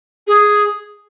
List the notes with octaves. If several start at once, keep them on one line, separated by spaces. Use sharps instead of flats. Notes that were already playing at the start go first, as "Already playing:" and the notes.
G#4